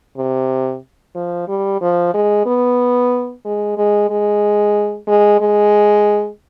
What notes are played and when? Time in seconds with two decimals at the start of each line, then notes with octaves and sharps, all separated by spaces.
0.17 C3
1.15 F3
1.48 G3
1.81 F3
2.14 G#3
2.46 B3
3.45 G#3
3.77 G#3
4.10 G#3
5.08 G#3
5.41 G#3